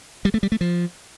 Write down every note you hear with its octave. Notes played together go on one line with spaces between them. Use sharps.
G3
A3
G3
A3
F3